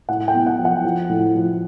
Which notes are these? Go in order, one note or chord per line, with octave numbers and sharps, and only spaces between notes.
A2 F#5
G5
B3
F#5
F3
F#5
F3
A2
F3